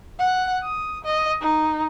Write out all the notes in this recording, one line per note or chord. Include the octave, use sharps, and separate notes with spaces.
F#5
D#6
D#5
D#4